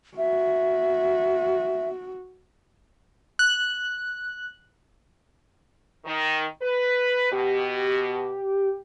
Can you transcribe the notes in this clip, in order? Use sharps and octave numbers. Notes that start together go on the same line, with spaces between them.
F#4 E5
F#6
D#3
B4
B2 G4